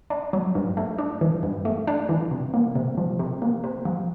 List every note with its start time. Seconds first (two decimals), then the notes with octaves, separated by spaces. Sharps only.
0.10 D4
0.33 F#3
0.55 G2
0.77 A3
0.99 D4
1.21 E3
1.43 G2
1.65 A3
1.87 D4
2.09 E3
2.31 C3
2.54 A#3
2.75 C3
2.98 F3
3.19 C3
3.42 A#3
3.64 C3
3.85 F3